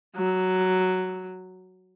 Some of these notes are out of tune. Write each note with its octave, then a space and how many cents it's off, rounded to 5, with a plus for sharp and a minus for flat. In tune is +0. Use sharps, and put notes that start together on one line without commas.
F#3 +5